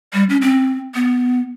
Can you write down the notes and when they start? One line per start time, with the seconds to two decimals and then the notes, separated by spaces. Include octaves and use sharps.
0.13 G3
0.30 C#4
0.41 C4
0.95 B3